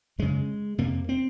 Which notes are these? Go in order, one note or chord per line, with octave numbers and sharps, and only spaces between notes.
F#2 C#3 G#3
F2 C3 A#3
C4